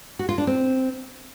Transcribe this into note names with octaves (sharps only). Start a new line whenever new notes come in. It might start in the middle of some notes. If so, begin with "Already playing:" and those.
F#4
F4
D4
C4